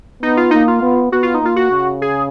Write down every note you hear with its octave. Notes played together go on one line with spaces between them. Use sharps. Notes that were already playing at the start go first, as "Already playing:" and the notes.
B3 D#4
F4
A#3 D#4
F4
B3
B3 F#4
F4
D#4
A#3 F4
F#4
C#3
G#4